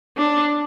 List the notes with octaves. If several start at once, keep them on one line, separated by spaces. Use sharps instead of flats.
D4